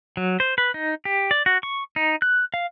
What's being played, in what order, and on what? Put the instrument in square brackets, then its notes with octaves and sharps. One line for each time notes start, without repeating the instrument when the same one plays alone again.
[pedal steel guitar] F#3
C5
B4
D#4
G4
D5
F#4
C#6
D#4
F#6
F5